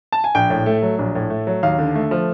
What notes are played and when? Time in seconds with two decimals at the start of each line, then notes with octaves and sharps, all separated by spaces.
0.12 A5
0.24 G#5
0.35 A#1 G5
0.50 A2
0.66 A3
0.82 F#3
0.99 A#1
1.15 A2
1.30 A3
1.47 F#3
1.63 D#2 F5
1.78 D3
1.95 A3
2.11 F3